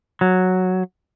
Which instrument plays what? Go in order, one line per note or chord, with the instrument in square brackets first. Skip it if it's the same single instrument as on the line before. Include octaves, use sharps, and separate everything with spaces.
[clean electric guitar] F#3